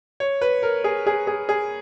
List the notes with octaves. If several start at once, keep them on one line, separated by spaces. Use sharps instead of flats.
C#5
B4
A#4
G#4
G#4
G#4
G#4